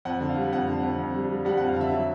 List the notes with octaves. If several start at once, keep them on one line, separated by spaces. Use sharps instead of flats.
F2 F#5
D3
F5
G3
F2 F#5
D3
F2
F2
G3
G3
G3 F#5
F2 F#5
F5
D3 E5
F#3